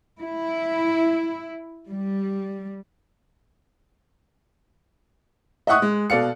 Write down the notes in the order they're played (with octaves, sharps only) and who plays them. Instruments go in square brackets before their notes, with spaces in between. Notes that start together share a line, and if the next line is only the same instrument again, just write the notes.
[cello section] E4
G3
[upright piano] D#5 E5 F#5 C#6 D#6 F#6
G#3
B2 A4 D5 F5 C#7